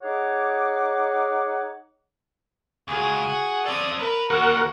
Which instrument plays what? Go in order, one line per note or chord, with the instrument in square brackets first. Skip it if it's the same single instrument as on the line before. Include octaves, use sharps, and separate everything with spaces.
[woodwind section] D#4 G#4 C#5 F#5 D6
[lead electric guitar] C#2 [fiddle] F#4 G#4
[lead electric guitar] F#5
[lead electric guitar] C4 A4 [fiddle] D5 D#6
[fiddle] A#4 [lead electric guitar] B4 B5
[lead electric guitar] D#2 [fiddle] F#4 [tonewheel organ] A#4 F#5